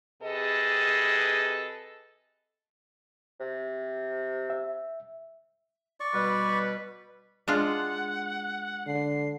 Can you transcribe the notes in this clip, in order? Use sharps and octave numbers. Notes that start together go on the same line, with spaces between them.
C3 G#4 A4 B4 D#5
C3
E5
D5 C#6
B2 G3 B4
G#3 D4 F4 F#5
D3 C7